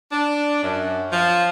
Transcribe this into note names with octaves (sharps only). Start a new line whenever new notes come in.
D4
F#2
F3